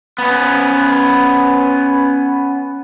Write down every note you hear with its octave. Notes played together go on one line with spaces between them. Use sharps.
B3 C#4